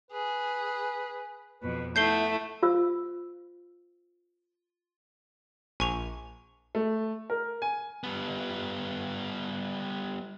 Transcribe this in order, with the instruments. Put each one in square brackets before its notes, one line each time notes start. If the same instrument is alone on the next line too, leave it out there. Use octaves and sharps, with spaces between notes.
[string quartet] G#4 [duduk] B4
[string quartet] F2 B2 [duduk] B4
[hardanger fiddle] A3 [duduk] B3 [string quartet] E4 [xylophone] G6 C7 G7
[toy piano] F4 C5 F5 E6
[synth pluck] A#1 [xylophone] G#5 C#6 F7
[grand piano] A3
A#4
G#5
[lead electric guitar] G3 B3